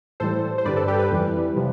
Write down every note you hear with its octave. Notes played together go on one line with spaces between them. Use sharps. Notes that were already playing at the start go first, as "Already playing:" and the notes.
A2 E3 G3 A4 C5
C5
G2 D3 G3 B4 D5
A4
G4 B4
G4 B4
F2 E3 G3
C3 F3